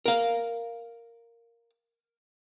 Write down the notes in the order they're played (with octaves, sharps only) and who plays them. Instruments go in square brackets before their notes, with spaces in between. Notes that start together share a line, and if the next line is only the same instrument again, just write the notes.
[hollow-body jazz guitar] A#4 F5